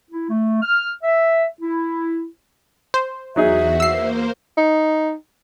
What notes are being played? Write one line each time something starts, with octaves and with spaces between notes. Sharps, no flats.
E4
A3
F6
E5
E4
C5
E2 F#3 D#4 F#4 G#4 E5
A#3 C5 E6 C7
D#4